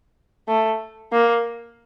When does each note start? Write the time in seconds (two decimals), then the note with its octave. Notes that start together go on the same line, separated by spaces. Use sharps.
0.48 A3
1.12 A#3